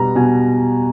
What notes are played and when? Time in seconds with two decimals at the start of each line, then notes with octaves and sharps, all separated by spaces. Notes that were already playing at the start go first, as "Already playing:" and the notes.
Already playing: B2 G3 B3 A#5
0.15 B2 G#5